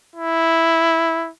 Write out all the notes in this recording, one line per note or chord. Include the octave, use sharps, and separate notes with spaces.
E4